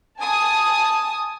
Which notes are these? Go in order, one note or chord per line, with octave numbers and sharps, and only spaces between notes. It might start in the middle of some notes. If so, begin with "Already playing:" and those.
G#5 A5 D#6